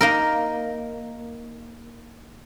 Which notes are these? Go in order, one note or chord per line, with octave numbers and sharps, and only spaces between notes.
A#3 D#4 A#4